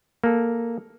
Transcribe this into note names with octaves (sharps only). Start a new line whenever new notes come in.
A#3 A4